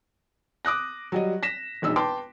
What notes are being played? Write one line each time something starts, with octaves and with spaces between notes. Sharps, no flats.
D6 D#6 F#6 A#6
F#3 G3 D#5
A#6 B6 E7
E1 A#1 D#4 E6
B4 G5 A5 C6 D6